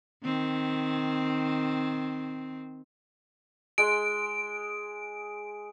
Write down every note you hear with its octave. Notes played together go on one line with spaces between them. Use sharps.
D#3 C4
G#3 D7